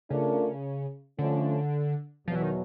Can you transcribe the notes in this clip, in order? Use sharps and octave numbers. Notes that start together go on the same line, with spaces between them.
C#3 A3 D4 F4 A#4
D3 F3 A3 C#4
E2 B2 F3 F#3
E3
D#3